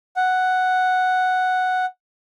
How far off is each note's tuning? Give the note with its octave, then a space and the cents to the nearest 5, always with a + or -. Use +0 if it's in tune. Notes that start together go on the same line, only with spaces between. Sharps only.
F#5 +0